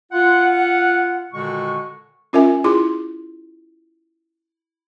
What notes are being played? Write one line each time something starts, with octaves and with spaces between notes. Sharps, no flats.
F4 F#5
A#2 D3 D#3 G#3 F#4 C#6
C#4 F4 A#4 E5 G#5
E4 F4 G#4 C6